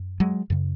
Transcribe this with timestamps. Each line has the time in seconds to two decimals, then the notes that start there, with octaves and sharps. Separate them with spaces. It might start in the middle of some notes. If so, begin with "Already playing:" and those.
Already playing: F#2
0.20 F#3 G#3
0.50 F#2 C#3